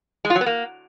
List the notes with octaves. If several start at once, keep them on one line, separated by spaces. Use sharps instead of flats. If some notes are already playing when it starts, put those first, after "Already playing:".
G#3
F4
F#3
B3
A#3